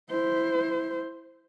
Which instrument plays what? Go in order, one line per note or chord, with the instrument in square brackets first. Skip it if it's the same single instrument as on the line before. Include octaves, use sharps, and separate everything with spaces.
[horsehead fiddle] E4 C5